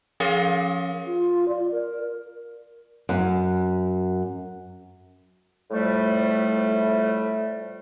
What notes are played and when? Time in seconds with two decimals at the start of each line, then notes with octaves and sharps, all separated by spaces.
0.20 F3 C#4 G#4 A#4 C#5 F5
1.06 F4
1.48 D5
1.71 A#4
3.09 F#2
5.71 A2 F3 G3 A3